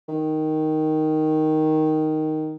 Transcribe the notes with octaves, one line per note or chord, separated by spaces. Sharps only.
D#3